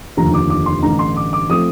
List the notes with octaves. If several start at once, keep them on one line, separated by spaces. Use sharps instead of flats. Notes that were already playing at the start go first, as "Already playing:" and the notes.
F1 D#2 D3 F3 A#5
D6
D6
C6
A1 G2 D3 A#5
C6
D6
D6
F3 A3 C4 D#6